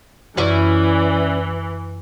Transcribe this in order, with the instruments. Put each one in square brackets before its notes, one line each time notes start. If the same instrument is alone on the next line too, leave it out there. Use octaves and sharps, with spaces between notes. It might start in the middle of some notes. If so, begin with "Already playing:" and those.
[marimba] F#2 [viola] E3 [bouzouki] C#4 E4 D5